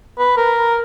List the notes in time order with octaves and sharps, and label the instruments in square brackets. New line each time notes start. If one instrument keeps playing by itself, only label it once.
[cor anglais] B4
A#4